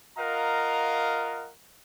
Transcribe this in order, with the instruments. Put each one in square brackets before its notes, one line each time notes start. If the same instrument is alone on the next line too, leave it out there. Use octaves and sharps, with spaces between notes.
[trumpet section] F4 A#4 D#5 F5 F#5 A#5